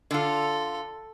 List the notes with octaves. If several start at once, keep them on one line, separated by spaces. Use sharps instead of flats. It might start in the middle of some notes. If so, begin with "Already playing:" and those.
D3 F4 A4